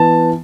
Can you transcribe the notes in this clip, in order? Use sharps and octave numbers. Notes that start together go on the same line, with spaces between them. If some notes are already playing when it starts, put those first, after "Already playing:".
Already playing: E3 B3 A5